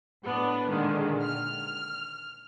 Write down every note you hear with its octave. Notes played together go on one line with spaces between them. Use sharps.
A2 B3 D4
A#2 D3 D#3 G#3
F6